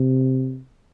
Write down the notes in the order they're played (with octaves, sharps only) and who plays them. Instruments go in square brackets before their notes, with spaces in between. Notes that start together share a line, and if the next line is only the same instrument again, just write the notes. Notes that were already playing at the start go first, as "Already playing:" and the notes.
Already playing: [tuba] C3